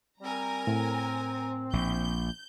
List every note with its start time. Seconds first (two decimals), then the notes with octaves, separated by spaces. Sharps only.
0.20 G3 C4 A#4 G#5 A#5
0.67 A2 C4
1.73 A#1 G6